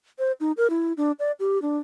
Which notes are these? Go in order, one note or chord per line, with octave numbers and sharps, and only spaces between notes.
C5
D#4
A#4
E4
D4
D5
G4
D4